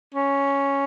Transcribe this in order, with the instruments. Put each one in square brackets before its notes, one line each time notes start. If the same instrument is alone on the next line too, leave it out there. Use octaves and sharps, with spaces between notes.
[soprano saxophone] C#4